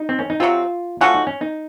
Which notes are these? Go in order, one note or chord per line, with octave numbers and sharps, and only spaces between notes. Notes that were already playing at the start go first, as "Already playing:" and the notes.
Already playing: D#4
C4
C#4
D#4
C3 F#3 C4 F4
F3 A3 C#4 F4 F#4
D#4
C#4
D#4